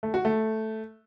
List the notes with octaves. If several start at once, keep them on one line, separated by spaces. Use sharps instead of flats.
A3
F#4
A3